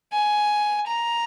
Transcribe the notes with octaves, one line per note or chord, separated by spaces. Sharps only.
G#5
A#5